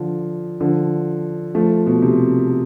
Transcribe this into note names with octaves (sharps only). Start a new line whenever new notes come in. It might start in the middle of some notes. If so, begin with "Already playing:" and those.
Already playing: D3 F3
D3 F3
F3 A3
B2
C3